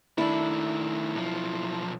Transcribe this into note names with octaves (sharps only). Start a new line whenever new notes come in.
D#3 A3 D4 E4
B1 F3